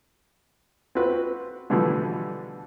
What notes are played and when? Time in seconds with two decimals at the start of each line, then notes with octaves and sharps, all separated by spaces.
0.95 C4 F4 F#4 B4
1.70 B2 D3 E3 F3 G3 A3